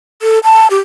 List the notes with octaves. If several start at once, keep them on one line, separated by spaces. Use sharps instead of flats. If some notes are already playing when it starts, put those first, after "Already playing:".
A4
A5
G4